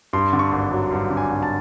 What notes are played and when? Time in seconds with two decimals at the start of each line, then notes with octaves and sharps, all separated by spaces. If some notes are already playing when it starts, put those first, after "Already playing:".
0.13 G2 C6
0.33 D3
0.39 C#6
0.52 G#1
0.71 F#3
0.91 G2
1.10 D3
1.17 G#5
1.30 G#1
1.43 A5